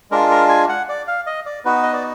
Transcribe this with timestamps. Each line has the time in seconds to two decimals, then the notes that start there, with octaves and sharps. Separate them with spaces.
0.11 G#3 D4 F4 A#4
0.31 A#4
0.49 G#5
0.69 F#5
0.89 D5
1.07 F5
1.27 D#5
1.46 D5
1.65 B3 D#4 F#4 B4
1.83 D#5
1.93 D5